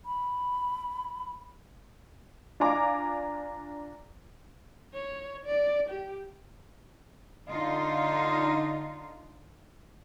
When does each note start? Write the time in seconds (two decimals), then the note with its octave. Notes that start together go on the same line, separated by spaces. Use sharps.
0.06 B5
2.60 D4 F4 F5 G#5 A#5 D6
4.94 C#5
5.45 D5
5.89 G4
7.50 D3 D#4 F4